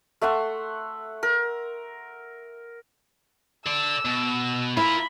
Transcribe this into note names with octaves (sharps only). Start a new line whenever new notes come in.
A3 E5 F#5 C6
A#4
A4 D5 E6
B2
E4 F4 A#4 B5